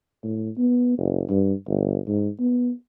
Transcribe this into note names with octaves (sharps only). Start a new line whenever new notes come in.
A2
B3
F#1
G2
G1
G#2
B3